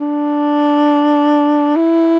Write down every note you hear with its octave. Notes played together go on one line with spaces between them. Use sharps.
D4
E4